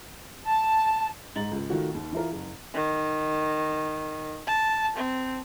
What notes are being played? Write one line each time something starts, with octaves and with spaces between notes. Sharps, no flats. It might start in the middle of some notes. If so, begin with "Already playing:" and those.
A5
G#2 A#5 A6 F#7
C#2
D#3 A3 F4 F#4
D#2
E3 E4 F4 A#4
F#1
D#3
A5
C4